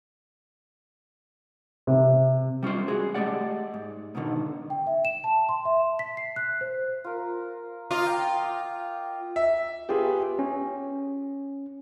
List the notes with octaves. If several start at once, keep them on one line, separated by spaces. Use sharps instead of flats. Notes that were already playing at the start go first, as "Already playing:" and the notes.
C3
G3 C#4 F4 C5
G#3 F#4 G#4
G#3 A3 G4 D5 F#5
G#2
G#2 B2 D3 D#3
G5
E5
E7
A5
C6
E5
B6
C7
F#6
C5
F4 A#4
F4 D#5 A#5 D6
G5
E5
B3 F4 G4 G#4
C#4